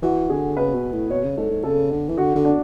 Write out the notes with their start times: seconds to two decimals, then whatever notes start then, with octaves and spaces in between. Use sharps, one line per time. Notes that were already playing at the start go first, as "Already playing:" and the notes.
0.03 E3 F#4
0.29 D3 G#4
0.56 C#3 B4
0.74 B2
0.93 A2
1.10 B2 C#5
1.24 C#3
1.37 G#2 A4
1.51 G#2
1.63 C#3 A4
1.91 D3
2.09 E3
2.18 D3 F#4
2.36 D3
2.45 D4